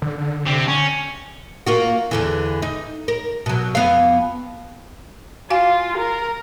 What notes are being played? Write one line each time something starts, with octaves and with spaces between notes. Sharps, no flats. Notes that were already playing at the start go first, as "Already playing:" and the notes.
D3
D3
C3 C4
C#4
A#3 F4 F#4
E2 D3 E3
D#4
A#4
B2 F#3
F2 B3 F5
F4 F#4 F5 G#5
A#4